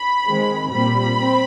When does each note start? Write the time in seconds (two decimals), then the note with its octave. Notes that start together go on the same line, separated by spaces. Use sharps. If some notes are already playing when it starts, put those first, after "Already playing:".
Already playing: B5
0.28 D#3 G#3 C4
0.72 A#2 G3 C4 B5
1.16 C4